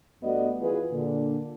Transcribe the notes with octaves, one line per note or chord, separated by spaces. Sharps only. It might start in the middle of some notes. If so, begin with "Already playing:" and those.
G2 A3 B3 F#4 D5 D#5
E3 F4 F#4 G#4 B4
A#2 D3 D4